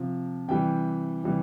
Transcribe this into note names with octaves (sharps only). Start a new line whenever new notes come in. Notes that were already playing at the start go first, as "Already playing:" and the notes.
Already playing: C3 F3
C3 E3 G3 G5
C3 E3 G3